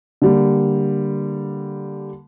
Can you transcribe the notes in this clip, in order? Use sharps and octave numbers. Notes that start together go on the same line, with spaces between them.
D3 G3 A#3